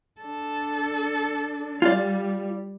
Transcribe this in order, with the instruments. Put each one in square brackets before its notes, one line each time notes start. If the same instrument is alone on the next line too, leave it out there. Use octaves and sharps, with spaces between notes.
[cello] D4 A4
[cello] G3 [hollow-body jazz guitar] F4 D5